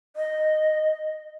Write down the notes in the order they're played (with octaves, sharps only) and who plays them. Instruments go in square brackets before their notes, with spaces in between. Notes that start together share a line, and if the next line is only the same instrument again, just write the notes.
[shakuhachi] D#5